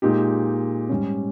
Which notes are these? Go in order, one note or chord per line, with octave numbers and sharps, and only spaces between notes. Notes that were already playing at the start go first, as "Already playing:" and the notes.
A#2 G#3 D#4 G4
G#2 G3 C#4